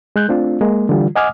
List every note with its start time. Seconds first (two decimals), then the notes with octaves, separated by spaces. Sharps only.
0.16 G#3 F#6 G6
0.28 A3 C4 D4 F4
0.61 G#3 A#3
0.89 D3 E3 G3 F4
1.16 D#5 F#5 G#5 D6 D#6 F6